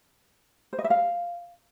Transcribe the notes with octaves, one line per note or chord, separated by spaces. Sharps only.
C5
D#5
E5
F5